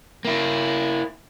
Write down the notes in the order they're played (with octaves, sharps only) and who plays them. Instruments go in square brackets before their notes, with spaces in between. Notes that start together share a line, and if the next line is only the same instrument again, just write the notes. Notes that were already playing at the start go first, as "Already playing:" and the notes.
[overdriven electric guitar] A#3 E4